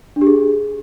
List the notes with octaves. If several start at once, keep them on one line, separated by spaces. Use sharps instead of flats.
D4
G4
G#4